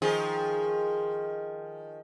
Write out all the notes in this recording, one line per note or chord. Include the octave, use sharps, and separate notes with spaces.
D#3 F3 G#4